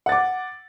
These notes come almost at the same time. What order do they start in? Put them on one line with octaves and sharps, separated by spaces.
F#5 A6 D6